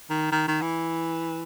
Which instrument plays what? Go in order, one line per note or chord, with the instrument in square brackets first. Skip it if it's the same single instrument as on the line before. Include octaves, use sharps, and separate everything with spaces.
[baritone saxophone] D#3
D#3
D#3
E3